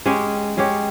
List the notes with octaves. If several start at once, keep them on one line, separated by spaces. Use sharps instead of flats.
G#3 C#4 G4 C#5
G#3 C#4 G4 C#5